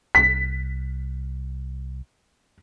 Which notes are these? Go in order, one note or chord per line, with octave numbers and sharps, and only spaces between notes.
C2 B6